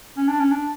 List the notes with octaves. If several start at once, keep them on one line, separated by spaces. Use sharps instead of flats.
C#4
D4
C#4
D4